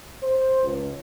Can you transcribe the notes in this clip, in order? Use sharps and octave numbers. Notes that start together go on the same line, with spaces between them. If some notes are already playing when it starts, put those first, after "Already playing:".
C5
C#2